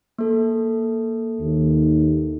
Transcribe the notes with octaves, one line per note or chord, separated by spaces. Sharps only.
A#3 A4
D#2